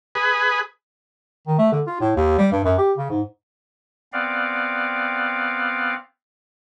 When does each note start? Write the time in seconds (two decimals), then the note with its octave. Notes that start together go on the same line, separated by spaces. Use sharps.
0.15 G#4 B4
1.47 D#3
1.59 A3
1.72 D3
1.87 F4
2.01 A2
2.16 D#2
2.38 G3
2.52 G2
2.64 F#2
2.78 G4
2.97 C#3
3.10 G#2
4.13 B3 C4 D5 F5